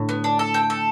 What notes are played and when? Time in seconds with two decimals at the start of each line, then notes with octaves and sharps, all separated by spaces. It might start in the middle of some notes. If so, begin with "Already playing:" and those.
Already playing: A2 D3
0.09 B3
0.24 D4
0.39 A4
0.54 G5
0.70 A4